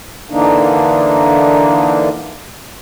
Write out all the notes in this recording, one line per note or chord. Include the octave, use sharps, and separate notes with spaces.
D3 E3 A#3 D4 D#4